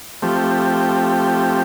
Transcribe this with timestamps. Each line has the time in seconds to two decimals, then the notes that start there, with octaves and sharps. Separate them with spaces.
0.22 F3 A3 C4 G4